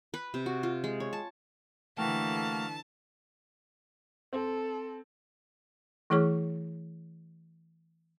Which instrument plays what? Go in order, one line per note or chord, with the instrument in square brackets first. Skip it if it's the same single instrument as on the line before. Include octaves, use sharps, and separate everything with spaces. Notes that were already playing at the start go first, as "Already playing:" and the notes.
[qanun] B4
C3
F#4
F4
G#3
C#5
A5
[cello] D3 E3 [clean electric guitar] A3 G5 [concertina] A#3 F#4 F6 [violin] A5
[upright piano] C4 [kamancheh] A4
[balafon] E3 A3 E4 G#4 C#5 C#6